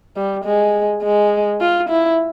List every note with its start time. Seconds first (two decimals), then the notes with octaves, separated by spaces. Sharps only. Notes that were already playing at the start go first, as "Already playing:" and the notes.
0.17 G3
0.45 G#3
1.03 G#3
1.61 F4
1.89 E4